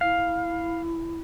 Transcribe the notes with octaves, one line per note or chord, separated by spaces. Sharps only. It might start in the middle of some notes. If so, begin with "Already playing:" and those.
E4 F5